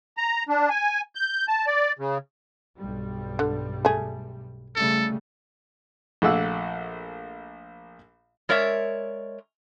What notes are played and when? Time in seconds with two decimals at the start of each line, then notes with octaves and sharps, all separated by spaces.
0.17 A#5
0.49 D4
0.70 G#5
1.15 G6
1.48 A5
1.67 D5
1.99 C#3
2.79 B1 G2 G3
3.39 D3
3.85 A3 G#4
4.76 C#3 G3 A3 A4
6.22 A#1 A3 A#3 F#5 E6
8.49 G#3 A#4 C#5 D5 E5